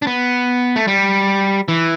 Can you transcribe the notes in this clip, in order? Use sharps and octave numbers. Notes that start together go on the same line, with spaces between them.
D4
B3
A3
G3
E3